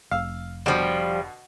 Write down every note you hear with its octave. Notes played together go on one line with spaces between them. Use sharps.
F1 F5 E6
B2 D3 F3 G3